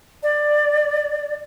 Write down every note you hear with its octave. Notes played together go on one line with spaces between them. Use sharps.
D5